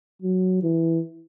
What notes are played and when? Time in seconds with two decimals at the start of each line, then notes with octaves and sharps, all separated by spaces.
0.22 F#3
0.63 E3